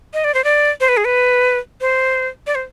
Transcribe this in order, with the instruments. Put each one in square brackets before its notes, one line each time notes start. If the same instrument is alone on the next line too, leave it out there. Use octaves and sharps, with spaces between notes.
[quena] D#5
D5
C5
D5
C5
B4
G#4
B4
C5
D5
C5